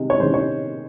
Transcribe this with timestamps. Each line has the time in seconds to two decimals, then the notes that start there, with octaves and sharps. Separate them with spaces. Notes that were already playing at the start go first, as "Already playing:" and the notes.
Already playing: C3 D#3 G#3
0.10 C#5
0.20 C3 D#3 G#3 C5
0.34 C#5